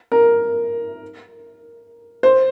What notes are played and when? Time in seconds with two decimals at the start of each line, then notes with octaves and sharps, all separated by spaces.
0.12 A#4
2.23 C5